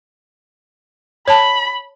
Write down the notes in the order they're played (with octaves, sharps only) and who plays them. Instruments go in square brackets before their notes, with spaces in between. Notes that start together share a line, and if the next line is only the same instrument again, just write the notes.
[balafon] C#5 A5 [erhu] B5